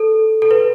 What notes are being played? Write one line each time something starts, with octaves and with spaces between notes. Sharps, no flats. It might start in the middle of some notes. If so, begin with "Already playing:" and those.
Already playing: A4
A4
B4